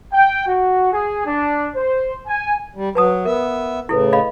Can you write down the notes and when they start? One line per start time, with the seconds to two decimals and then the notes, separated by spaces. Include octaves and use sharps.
0.12 G5
0.46 F#4
0.92 G#4
1.25 D4
1.75 C5
2.27 G#5
2.75 G3
2.95 F#3 B4 A5 D#6
3.25 B3 A#4 E5
3.89 A2 C#3 E4 A4 B4
4.13 D#5 F5 B5